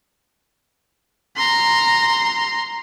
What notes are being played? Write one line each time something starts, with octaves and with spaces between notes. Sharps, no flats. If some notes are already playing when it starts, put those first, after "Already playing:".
A#5 C6